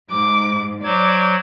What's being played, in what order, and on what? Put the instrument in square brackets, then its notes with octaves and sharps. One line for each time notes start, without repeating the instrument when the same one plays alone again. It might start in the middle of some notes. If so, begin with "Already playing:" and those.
[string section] G#2 [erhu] D6
[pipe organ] F#3 C5 G#6 [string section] D5 [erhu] D6